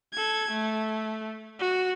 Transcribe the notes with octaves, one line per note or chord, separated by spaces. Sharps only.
A4 G#6
A3
F#4